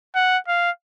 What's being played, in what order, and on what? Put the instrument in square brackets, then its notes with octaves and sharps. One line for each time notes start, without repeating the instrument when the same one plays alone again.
[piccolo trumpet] F#5
F5